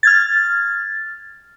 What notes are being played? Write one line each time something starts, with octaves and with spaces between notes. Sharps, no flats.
F6 G#6 A6